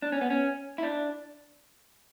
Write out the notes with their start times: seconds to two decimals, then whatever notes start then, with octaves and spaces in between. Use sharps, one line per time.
0.02 D4
0.12 C#4
0.21 B3
0.30 C#4
0.78 E4
0.83 D4